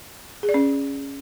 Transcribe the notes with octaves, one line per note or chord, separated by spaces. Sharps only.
G#4
D5
C#4